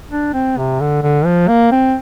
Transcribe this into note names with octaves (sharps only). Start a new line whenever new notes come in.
D4
C4
C3
D3
D3
F3
A#3
C4